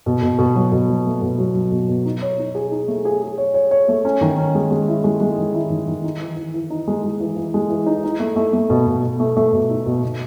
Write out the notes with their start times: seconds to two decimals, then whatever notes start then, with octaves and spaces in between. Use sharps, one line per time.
0.06 B2
0.22 B2
0.38 B2
0.55 F#3
0.72 B2
0.89 F#3
1.06 A3
1.22 B2
1.38 F#3
1.55 F#3
1.72 B2
1.89 B2
2.05 D#4
2.22 C#5
2.38 D#4
2.55 G#4
2.72 D#4
2.88 A3
3.05 G#4
3.21 G#4
3.38 C#5
3.54 C#5
3.71 C#5
3.88 A3
4.05 C#4
4.21 D#3
4.37 C#4
4.55 G#3
4.71 G#3
4.88 E4
5.04 G#3
5.20 G#3
5.38 D#3
5.54 E4
5.70 D#3
5.87 D#3
6.04 D#4
6.20 E3
6.37 E3
6.54 E3
6.70 D#4
6.88 G#3
7.03 G#3
7.20 E3
7.37 E3
7.54 G#3
7.70 E3
7.86 D#4
8.04 D#4
8.20 A3
8.36 A3
8.53 A3
8.70 B2
8.87 B2
9.03 B2
9.20 A3
9.37 A3
9.53 B2
9.69 D#4
9.86 B2
10.03 B2